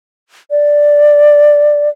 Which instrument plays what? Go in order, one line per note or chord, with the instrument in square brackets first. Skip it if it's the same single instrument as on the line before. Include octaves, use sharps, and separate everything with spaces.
[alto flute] D5